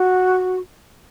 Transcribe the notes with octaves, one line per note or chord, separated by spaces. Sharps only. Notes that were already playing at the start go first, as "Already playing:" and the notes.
Already playing: F#4